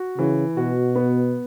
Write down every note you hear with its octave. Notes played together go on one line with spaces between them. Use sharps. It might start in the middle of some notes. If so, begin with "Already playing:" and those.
Already playing: F#4
C#3 E3
B2 F#4
B3